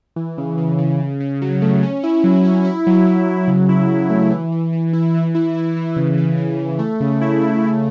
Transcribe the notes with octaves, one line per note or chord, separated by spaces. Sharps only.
E3
C#3
C#3
C#3
C#3
C#3
F#3
A3
C#4
E4
F#3
E4
E4
F#3
F#3
F#3
C#3
E4
C#3
A3
E3
E3
E3
E4
E3
E4
E4
E3
C#3
E3
E3
C#3
A3
C#3
E4
A3
C#3